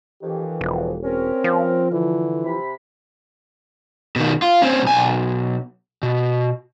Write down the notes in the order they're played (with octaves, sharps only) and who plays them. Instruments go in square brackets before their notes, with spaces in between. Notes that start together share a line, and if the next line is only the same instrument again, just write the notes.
[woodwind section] F2 D#3 E3 [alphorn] G4
[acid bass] E1 [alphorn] F3
[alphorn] C4 [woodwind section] C#4 A#4
[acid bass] F3
[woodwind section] D3 [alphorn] E3
[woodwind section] C3 B5
[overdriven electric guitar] B2 D#3
F4
C4 C#4
B1 G#5
B2